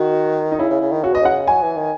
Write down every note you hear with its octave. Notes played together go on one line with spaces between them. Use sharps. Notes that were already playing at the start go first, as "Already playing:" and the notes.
Already playing: D#3 F#4
D#4
C#3 E4
C#3
C#3
D#3
C#3 F#4
B2 D#5
C#3 F#5
F#3 G#5
E3
D#3